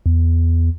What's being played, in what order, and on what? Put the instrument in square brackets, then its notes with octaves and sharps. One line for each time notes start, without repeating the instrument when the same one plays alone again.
[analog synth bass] E2